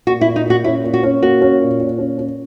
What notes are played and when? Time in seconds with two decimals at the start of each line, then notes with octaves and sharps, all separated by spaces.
0.07 A#2 F#4
0.21 E4
0.27 A#2
0.36 D#4
0.46 A#2 F#4
0.64 C#4 E4
0.84 A#2
0.94 F#4
1.03 C#4
1.22 A#3 F#4
1.41 C#4
1.60 A#2
1.80 A#2
1.98 C#4
2.18 C#4